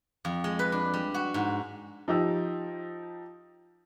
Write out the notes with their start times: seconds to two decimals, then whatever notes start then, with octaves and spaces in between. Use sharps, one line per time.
0.25 F2
0.44 G#3
0.59 B4
0.72 D4
0.94 G3
1.14 F#4
1.34 G#2
2.08 F3 D#4 G4 E6